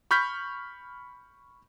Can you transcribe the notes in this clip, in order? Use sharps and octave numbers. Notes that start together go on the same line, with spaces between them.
B5 C#6 F6 G6 B6